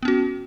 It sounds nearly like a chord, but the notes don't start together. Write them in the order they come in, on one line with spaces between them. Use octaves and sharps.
B3 C#4 F#4